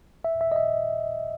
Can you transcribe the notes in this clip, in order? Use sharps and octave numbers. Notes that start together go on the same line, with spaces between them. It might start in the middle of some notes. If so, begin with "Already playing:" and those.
E5
E5
D#5
E5